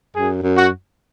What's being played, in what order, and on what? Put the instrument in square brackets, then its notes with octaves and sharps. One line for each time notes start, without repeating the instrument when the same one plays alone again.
[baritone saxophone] F#2 [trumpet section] G#4
[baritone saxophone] F#2
[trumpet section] F#4